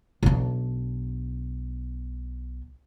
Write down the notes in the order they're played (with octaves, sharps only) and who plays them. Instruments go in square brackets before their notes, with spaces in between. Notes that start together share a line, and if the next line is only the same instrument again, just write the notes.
[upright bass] B1 D4